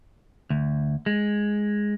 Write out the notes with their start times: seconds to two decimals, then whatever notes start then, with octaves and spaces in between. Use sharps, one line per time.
0.50 D2
1.06 G#3